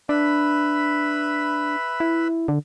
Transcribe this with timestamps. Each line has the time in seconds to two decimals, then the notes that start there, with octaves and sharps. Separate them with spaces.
0.09 D4 B4 E5 B5
2.00 E4
2.48 D3